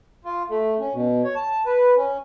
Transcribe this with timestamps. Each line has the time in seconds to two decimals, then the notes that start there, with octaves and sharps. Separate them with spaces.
0.25 F4
0.50 A3
0.80 C#4
0.93 B2
1.24 C#5
1.35 A5
1.66 B4
1.96 C#4